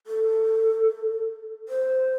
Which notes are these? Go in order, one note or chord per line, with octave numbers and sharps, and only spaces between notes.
A4
C5